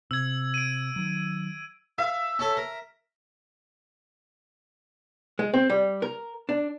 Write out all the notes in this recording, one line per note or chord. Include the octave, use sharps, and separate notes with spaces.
C3 E6 G#6
D7 D#7
D#3 F#3
E5 F5 E6
C#4 A4
A#4
G#3
C4
G3
A#4
D4